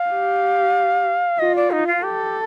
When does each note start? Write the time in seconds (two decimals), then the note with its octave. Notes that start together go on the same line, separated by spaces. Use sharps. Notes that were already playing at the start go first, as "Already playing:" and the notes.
Already playing: F5
0.10 G4
1.39 F4 D#5
1.56 D5
1.71 D#4
1.87 F4
2.03 G4 A4